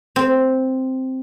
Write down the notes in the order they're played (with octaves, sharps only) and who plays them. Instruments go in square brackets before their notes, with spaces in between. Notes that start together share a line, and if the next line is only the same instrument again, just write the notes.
[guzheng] C4